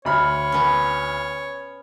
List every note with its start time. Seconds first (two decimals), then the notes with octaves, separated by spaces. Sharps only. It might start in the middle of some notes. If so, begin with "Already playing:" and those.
0.05 D2 C#5 B5 F6
0.52 B3 C#4